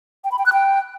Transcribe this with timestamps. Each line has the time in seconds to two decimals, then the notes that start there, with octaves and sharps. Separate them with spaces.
0.24 G5
0.32 B5
0.39 G5
0.46 F#6
0.53 G5